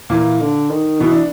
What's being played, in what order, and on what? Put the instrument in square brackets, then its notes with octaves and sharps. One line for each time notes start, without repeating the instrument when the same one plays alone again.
[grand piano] A#2 A#3 [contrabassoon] E3
[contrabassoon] D3
D#3
[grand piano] B2 B3 [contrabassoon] E3
[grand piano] D4